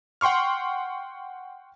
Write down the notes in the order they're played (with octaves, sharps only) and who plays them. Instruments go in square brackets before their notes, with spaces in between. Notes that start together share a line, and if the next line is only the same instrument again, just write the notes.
[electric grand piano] F#5 G5 C6 C#6 F6